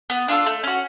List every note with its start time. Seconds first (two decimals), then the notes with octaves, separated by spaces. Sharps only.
0.10 B3
0.28 D4 F4 A4
0.47 A3
0.64 C#4 F#4